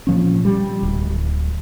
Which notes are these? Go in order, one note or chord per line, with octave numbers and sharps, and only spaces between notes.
A#2 F3 C#4
G3
D1